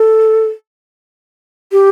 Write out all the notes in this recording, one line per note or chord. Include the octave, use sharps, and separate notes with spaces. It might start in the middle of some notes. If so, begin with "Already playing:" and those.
Already playing: A4
G4